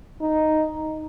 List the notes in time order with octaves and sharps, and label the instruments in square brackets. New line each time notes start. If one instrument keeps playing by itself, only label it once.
[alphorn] D#4